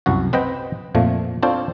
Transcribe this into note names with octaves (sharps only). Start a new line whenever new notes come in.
C2 F#2 F#4
C4 B4 D#5 F#5 G5
F2 A#2 F3 A3
C4 D4 F4 A4 C5 C#5